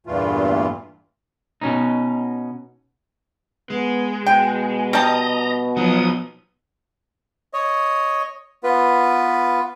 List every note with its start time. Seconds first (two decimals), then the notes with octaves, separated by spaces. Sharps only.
0.07 E2 G2 A#2 E3 A3 F4
1.61 B2 C#4 D#4
3.70 G#3 B3
4.26 B2 G5
4.93 G3 D#5 A5 A#5
5.77 F3 F#3 B3 D#4 D#6
7.53 C#5 D#5
8.64 B3 F4 B4